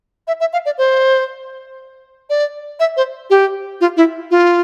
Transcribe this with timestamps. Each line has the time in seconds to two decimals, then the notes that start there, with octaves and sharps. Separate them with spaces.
0.27 E5
0.41 E5
0.53 F5
0.66 D5
0.78 C5
2.30 D5
2.80 E5
2.97 C5
3.30 G4
3.81 F4
3.97 E4
4.31 F4